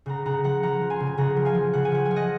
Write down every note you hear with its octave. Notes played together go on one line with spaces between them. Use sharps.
C#3 F#5 A#5
C#3 F#5 A#5
F3 F#5 A#5
F3 F#5 A#5
F3
G#5 C6
C#3
G#5
C#3 F#5 A#5
F3
F5 G#5
F3
C#3 F#5
G#5
F3 F#5
G#5
F3
D#5 F#5